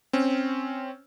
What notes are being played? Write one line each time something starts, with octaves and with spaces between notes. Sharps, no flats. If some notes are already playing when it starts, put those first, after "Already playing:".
C4 C#4